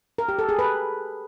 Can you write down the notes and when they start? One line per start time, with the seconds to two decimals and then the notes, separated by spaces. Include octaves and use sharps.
0.18 A#4
0.29 G4
0.39 A4
0.49 G#4
0.59 B4